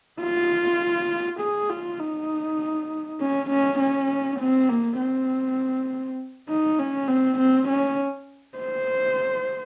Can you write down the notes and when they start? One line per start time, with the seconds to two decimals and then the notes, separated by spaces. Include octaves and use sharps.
0.21 F4
1.40 G#4
1.70 F4
2.00 D#4
3.20 C#4
3.50 C#4
3.79 C#4
4.40 C4
4.69 A#3
4.99 C4
6.48 D#4
6.79 C#4
7.08 C4
7.38 C4
7.68 C#4
8.58 C5